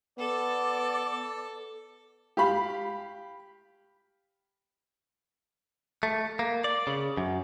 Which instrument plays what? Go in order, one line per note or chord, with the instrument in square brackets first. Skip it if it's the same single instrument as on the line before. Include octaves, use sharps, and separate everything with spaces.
[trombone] B3 [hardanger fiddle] A4 [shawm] D5
[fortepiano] G4 F5 B5
[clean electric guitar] A3
A#3
D5
C#3
F#2